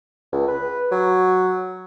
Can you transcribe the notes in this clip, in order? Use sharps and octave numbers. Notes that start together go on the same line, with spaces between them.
C#2
B4
F#3